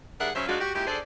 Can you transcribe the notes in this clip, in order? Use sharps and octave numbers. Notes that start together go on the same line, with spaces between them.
G3 D4 G#4 A#4 E5 F#5
C#3 F#3 C#4 C5 E5
G#3 D4 D#4 F4 F#4
F#4 G4
A#2 G#3 E4 G4
D4 G#4 A4 C5 D5